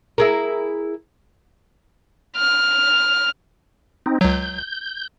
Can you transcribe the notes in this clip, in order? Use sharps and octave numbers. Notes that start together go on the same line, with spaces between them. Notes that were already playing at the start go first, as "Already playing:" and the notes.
E4 G#4 A#4
F6
C4 D#4
C#2 F#3 G6